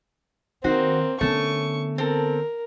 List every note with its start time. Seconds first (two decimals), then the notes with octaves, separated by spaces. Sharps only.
0.64 D#3 A#3 C4 D#4 F#4 C5
1.21 D3 A3 B3 C#4 C#6
1.98 C4 A4 A#4